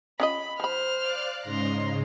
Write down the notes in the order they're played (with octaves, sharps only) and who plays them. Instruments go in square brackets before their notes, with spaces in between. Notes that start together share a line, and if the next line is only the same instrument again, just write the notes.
[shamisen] C#4 F4 D#5 [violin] B5
[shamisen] F3 B5 [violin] C5 F6
[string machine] D5 F5 F#6
[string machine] G#2 C#3 G#3 [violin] A#5 C6